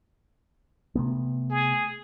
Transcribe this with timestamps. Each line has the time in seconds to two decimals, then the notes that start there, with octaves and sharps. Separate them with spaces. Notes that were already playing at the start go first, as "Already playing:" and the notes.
0.95 C3 A3 B3
1.50 G#4